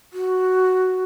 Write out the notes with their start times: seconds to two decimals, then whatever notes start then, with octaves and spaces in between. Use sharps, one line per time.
0.13 F#4